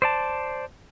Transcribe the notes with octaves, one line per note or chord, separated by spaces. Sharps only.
C5 D5 A5